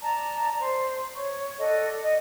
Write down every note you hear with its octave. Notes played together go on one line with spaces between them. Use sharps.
D5 A5 A#5
C5
C#5 C#6
A4 D5 D#5 F#5
D#5 F#5